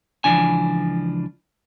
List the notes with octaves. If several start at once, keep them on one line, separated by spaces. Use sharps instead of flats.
C#2 E3 F3 D4 G#5